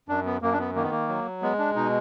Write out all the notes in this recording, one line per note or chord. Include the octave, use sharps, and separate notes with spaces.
F#2 D4
B3
F#2 A#3
D4
B3
D#3 A#3
B3
A#3
F#3
G#3 B3
D4
B2 D#4